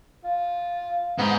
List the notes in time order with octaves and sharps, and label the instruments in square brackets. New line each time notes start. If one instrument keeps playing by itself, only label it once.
[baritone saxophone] F4
[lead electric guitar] G#2 [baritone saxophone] B3